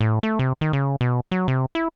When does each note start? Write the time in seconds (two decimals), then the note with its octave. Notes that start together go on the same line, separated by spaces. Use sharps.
0.01 A2
0.23 A3
0.39 C3
0.61 D#3
0.73 C#3
1.01 B2
1.31 F#3
1.48 C3
1.75 E4